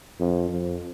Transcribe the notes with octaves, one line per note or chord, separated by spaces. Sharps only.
F2
F2